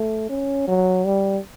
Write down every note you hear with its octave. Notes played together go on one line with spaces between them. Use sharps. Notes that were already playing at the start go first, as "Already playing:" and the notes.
Already playing: A3
C#4
F#3
G3